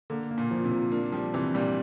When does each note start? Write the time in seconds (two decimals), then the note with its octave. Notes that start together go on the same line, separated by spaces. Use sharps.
0.10 D3 A#3
0.31 A#3
0.38 A#2
0.51 F3
0.64 C3
0.71 F3
0.92 A#3 D4
1.12 F3 G3
1.34 C3 E3
1.55 A#2 G3